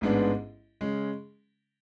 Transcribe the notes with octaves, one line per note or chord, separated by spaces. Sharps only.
A1 G#2 G#3 B3 D4
C#3 G#3 C#4